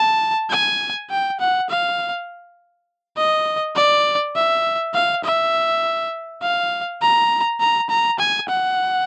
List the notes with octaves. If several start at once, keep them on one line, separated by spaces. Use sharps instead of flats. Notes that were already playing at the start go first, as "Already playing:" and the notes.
Already playing: A5
G#5
G5
F#5
F5
D#5
D5
E5
F5
E5
F5
A#5
A#5
A#5
G#5
F#5